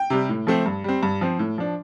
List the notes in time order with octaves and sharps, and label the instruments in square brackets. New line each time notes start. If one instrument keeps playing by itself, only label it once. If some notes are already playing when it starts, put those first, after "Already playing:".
Already playing: [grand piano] G5
C3 G3
A2
F3 A3 C4
G2
G3 C4
G2
F3 C4
A2
F3 D4